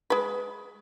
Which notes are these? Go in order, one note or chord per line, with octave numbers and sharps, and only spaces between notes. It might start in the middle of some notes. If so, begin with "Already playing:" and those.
G#3 B4